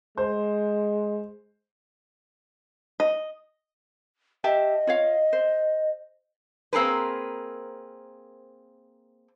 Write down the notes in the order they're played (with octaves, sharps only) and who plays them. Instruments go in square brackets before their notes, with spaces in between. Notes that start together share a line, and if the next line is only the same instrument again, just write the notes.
[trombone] G#3 [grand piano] C5
[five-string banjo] D#5
[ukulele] G4 E5 A5 [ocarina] D#5
[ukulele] F4 C#5 F5
C5
[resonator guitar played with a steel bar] A#3 C4 G#4 A#4 B4